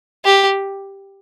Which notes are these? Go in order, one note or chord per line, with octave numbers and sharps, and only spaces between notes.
G4